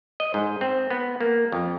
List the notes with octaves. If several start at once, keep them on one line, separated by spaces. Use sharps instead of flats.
D#5
G#2
C4
B3
A#3
F2